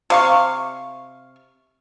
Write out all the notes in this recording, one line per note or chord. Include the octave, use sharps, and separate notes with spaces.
C3 F5 C#6